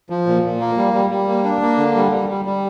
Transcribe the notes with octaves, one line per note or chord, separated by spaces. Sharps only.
F3
A#2
A#2
A#3
G3
G3
G3
A#3
D4
A#3
D3
G3
G3
G3
G3